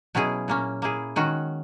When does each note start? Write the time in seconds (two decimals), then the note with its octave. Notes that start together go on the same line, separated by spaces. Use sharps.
0.15 B2 F#3 C#4 E4 G#4
0.48 A#2 A#3 C#4
0.82 A#3 E4 G#4
1.16 D#3 G#3 C#4 F#4